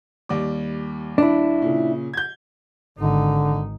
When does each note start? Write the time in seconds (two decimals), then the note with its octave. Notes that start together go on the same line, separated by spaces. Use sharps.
0.29 D#2 G3 D6
1.18 D4 E4
1.62 A#2 C#3
2.14 G6 G#6
2.98 G#1 D3 D#4